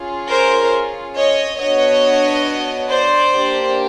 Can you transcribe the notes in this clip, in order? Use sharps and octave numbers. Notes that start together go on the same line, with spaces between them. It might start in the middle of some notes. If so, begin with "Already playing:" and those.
Already playing: C#4 F4 G#4
A#4 C5
C#5 D#5
B3 D4 F#4 C#5 D#5
C5 D5
A#3 D4 G4